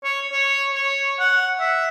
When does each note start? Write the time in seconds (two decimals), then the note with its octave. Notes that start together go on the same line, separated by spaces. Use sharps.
0.04 C#5
0.32 C#5
0.74 C#5
1.20 F#5
1.60 E5